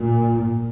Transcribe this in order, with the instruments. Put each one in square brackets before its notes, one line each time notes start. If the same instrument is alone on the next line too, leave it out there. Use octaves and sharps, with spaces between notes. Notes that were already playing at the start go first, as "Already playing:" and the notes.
Already playing: [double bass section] A#2